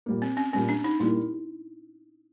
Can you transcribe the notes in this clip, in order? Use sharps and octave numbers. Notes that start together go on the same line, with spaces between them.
A#2 G3 A#3
C4
C#4
A#2 G3 A#3 C#4
D4
D#4
A#2 G3 A#3 E4